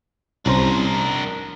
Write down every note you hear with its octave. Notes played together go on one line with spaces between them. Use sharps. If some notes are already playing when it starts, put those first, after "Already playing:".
C2 C#4 D4 A#4 C5